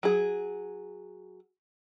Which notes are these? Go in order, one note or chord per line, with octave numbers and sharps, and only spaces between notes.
F#3 G#4